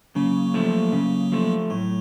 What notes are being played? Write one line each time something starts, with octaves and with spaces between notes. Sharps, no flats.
C#3 F#3 A#3
F3 A3
C#3
F3 A3
A2 F#3